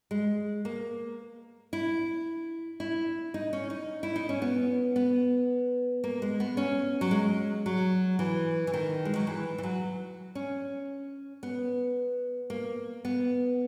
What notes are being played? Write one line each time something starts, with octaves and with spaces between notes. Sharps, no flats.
G#3
A#3
E4
E4
D#4
C#4
D#4
E4
D#4
C#4
B3
B3
A#3
G#3
B3
C#4
F#3
G#3
F#3
E3
E3
D#3
G#3
F#3
E3
E3
F#3
C#4
B3
A#3
B3